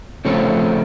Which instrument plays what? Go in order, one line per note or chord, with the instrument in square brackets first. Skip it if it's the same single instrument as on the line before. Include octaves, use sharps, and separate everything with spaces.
[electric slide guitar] C#3 F3 A3 C4 C#4